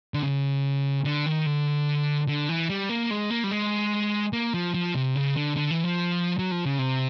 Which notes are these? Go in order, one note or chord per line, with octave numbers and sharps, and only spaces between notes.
D3
C#3
D3
D#3
D3
D3
E3
G3
A#3
G#3
A#3
G3
G#3
A#3
F3
F3
C3
C#3
D3
D3
E3
F3
F#3
F3
C#3
C3